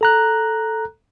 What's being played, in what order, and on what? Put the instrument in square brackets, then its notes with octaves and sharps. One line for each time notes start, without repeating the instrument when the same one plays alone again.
[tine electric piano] A4 A#5 F#6